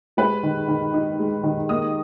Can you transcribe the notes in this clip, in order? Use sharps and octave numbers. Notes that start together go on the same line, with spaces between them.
G#3 B4 B5
D#3
D#3
D#4
G#3
D#3
A#3 D#5 D#6